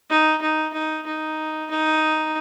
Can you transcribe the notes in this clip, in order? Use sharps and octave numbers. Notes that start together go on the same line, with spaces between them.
D#4
D#4
D#4
D#4
D#4